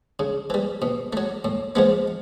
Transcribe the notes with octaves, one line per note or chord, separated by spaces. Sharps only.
C#3
E3 G3
B2
F#3 A3
A2
F3 G#3 B3